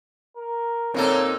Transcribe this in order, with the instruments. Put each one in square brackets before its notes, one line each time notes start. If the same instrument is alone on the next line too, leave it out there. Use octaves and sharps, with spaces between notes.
[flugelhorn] A#4
[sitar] A#2 D#4 A4 [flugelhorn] A#3 [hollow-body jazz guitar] C4 A#4 [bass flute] C#5